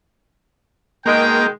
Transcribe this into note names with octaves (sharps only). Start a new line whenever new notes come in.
B2 D#3 G#3 A#3 G5